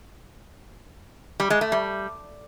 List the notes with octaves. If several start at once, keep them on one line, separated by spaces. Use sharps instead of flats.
G3
G#3
A3
G3